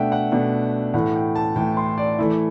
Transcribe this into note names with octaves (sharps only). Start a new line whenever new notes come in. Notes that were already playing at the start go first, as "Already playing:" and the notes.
Already playing: B2 A3 D4 E5 F#5 G5
F#5
B2 A3 D4
A2 E3 A3 F#5
G5
A5
A2 E3 A3 G5
C6
D5
E3 A3 E4